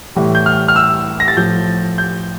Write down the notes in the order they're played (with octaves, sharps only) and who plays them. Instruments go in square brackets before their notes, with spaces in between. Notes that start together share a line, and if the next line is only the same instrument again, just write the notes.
[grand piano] A2 E3 G3
G6
F6
F6
E6
A#6
A6
A2 F3 G6
G6